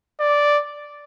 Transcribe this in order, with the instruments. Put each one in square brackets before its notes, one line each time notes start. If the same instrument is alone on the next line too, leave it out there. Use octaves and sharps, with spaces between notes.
[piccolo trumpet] D5